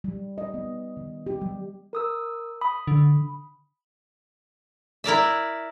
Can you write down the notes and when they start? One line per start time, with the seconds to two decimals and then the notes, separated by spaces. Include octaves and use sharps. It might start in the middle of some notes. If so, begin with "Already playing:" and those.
0.04 G3
0.38 D#5
0.54 B3
0.97 D#3
1.26 G4
1.41 G3
1.93 A#4 D#6 E6
2.61 B5 D#6
2.87 D3
5.04 E4 A#4 D5 E5